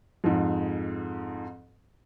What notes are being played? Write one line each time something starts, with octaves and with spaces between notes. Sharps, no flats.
F2 G#2